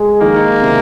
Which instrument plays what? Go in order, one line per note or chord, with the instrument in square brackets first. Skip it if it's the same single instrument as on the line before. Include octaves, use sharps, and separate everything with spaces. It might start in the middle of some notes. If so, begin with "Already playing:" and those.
Already playing: [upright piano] G#3
[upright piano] D#3 [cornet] A#3
[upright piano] C3